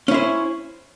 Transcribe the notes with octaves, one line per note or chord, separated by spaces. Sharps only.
C#4 E4 C5